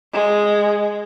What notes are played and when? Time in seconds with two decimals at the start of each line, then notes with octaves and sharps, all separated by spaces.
0.13 G#3